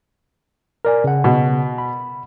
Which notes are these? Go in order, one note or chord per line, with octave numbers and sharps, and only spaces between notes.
A#4 D5 G#5
C#3 F#5
B2
B5